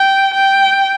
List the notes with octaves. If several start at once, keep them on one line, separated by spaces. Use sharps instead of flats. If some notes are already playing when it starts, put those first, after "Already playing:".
Already playing: G5
G5